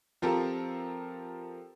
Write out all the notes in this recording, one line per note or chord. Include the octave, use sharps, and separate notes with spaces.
F3 C4 F4 G4 A4 A#4